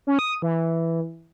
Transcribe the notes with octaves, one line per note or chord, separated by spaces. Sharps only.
C#4
D#6
E3